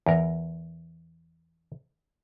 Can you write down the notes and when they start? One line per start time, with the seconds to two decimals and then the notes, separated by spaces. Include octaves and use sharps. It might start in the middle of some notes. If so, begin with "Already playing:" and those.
0.06 E2 A#4